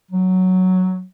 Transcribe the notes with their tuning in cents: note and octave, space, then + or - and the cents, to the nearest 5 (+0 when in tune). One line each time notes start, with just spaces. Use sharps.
F#3 +0